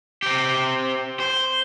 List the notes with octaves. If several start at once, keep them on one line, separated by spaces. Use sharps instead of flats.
C4 G4
C5